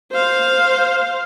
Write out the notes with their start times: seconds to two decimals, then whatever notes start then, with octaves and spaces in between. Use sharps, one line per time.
0.12 C5 F5